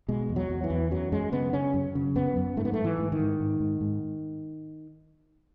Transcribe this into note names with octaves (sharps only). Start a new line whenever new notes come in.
B2 G#3
E2
F#3
E2
E3
E2
F#2 F#3
F#2 G#3
C#3 B3
C#3 C#4
F#2
C#3
F#2 B3
F#2
G#2 A3
B3
G#2 A3
E3
G#2
D#3
G#2
G#2
G#2
G#2